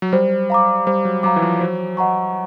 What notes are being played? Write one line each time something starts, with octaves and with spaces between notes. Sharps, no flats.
F#3
G3 C5
F5 A#5 D6
G3 C5
F#3
F#3 F5 A#5 D6
E3
F3
F#3 C5
D#5 F#5 A#5 C#6